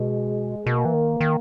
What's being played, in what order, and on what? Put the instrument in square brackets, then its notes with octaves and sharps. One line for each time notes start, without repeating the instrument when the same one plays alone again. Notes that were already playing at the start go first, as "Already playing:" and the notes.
Already playing: [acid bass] B2 [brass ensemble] G#3
[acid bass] B2 [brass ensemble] A#3
[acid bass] E3
D#3
D#3